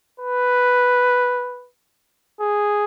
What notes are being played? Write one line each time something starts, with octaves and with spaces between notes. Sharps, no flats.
B4
G#4